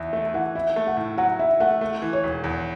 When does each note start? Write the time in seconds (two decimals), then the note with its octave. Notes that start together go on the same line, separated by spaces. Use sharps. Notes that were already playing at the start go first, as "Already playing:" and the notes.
Already playing: E2 E5
0.13 A3 E5
0.34 E3 F#5
0.55 E4 E5
0.76 A3
0.87 F#5
0.97 A2
1.18 F#3 F#5
1.39 E4 E5
1.60 A3 F#5
1.81 A3
2.02 E3
2.13 C#5
2.23 E1
2.44 E2